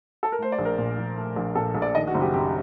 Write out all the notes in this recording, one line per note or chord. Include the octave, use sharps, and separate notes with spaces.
A4
A#4
A3 C5
D5
A#1
A#4
A#2
A#1
A3
A#1
A#2 A4
A#1
D5
D#3 D#5
F#4
F#1
G4
F#2 G4